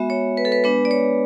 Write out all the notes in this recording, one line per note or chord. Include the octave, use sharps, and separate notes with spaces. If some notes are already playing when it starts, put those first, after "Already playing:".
Already playing: G#3 B3 F#4 E5
C#5
B4
A4
B4
G#3 B3 D4 B4
D5
C#5